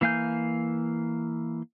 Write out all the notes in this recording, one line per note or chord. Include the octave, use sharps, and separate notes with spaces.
E3 A#3 F5 G#5 G6